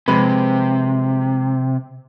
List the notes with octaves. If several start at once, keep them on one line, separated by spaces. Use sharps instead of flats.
C3 F3 G#3 B4